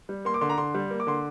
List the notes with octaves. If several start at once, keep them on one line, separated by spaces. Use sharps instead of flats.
G3
A#3 C6
D6
D3 C6
A#5
D3 C6
G3
A#3
D6
D3 C6